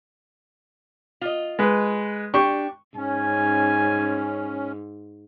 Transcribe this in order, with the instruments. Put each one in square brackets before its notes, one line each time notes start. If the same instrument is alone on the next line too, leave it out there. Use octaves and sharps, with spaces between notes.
[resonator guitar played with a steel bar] F4 D#5
[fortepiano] G#3 B4
[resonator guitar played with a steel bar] D4 G4 [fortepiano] C#6
[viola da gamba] G#2 [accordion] C#4 [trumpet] G#5